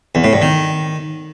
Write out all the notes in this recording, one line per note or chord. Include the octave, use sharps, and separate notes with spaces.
E2
A2
G2
D#3